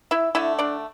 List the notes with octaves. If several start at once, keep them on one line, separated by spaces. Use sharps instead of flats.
E4 E5
D3 A3 E4 E5
D4 D5